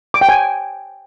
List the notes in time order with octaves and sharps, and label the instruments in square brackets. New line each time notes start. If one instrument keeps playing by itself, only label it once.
[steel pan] D6
G5
G#5